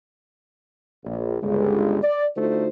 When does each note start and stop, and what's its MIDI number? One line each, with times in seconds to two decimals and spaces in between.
1.04 1.37 34
1.42 1.98 31
1.42 1.98 37
1.42 1.98 56
2.02 2.26 74
2.36 2.68 50
2.36 2.68 57
2.36 2.68 63
2.36 2.68 65
2.36 2.68 66
2.36 2.68 72